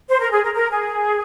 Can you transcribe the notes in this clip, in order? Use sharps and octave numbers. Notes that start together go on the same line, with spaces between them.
C5
A#4
G#4
A#4
A#4
G#4